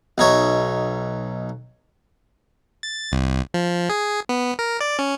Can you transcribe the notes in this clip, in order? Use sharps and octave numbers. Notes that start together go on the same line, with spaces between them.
B1 D#4 C#5 E5
A6
C2
F3
G#4
B3
A#4
D5
C#4